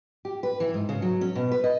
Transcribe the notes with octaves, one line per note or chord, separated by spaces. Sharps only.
G4
B4
E3
G#2
C#3
F#3
C#4
B2
B4
D#5